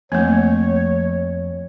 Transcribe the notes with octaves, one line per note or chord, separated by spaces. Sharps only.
F2 A3 A#3 C#5